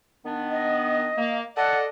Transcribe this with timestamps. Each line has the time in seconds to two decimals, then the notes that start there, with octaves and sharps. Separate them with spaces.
0.25 D#3 B3 D4
0.51 D#5
1.18 A#3
1.57 A4 D5 D#5 F#5